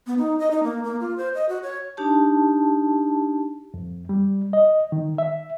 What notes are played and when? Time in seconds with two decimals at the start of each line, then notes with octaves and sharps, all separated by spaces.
0.07 B3
0.18 D#4
0.39 D#5
0.51 D#4
0.63 A#3
0.84 A#3
1.00 F4
1.17 C5
1.34 D#5
1.49 F#4
1.63 C#5
1.97 D4 D#4 G4 A5
3.74 F2
4.09 G3
4.53 D#5
4.92 D#3
5.18 E5